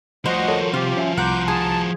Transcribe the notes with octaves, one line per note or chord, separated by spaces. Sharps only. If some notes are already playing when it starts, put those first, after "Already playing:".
D2 F3 F#4 C5 D#5 F#5
A4 A#4 C#5
C3 F4 G4
C#4 E5 G#5
C2 F#5 A#5 C6 D6 G6
G#4 A5